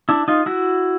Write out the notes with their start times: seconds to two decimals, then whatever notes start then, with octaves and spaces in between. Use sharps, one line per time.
0.09 D4 E4
0.28 D#4 F4
0.46 E4 F#4